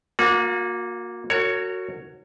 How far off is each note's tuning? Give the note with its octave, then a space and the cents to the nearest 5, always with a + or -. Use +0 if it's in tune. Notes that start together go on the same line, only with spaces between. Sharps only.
A#3 +0 F#4 -40
F#4 +0 A#4 -35 C#5 +5